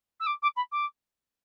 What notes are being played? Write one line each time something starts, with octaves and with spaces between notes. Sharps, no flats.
E6
D6
D6
B5
D6